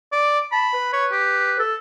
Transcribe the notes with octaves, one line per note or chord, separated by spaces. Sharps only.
D5
A5 B5
B4
C#5
G4
A4